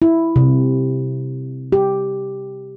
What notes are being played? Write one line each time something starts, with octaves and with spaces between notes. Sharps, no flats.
E4
C3
G4